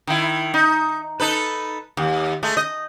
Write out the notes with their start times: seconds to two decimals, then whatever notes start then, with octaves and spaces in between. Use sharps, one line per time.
0.07 D#3 E4
0.54 D#4
1.20 D#4 A4 B4
1.97 D#2
2.43 G#3 A3
2.57 D#5